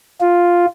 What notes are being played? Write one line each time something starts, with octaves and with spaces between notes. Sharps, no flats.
F4